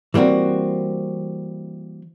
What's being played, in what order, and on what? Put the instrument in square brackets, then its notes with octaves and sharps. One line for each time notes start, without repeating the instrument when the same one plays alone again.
[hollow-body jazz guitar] E3 G3 A#3 C4 F#4